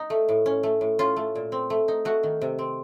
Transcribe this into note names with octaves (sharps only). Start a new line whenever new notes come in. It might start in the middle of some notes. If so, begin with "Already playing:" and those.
Already playing: D#4
A3
A2
C#4
A3
A2
C#4 F4
A3
A#2
C4
A3
D#4
A3 F#4
D#3
C3
C4